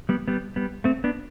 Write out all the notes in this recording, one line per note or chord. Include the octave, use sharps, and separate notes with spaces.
G3 B3
G3 B3
G3 B3
A3 C4
B3 D4